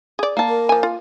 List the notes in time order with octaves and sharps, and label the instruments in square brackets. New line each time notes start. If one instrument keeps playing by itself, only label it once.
[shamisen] G#4 D5
[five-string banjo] A#3 A5
[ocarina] A#4
[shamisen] F3 G#5
F4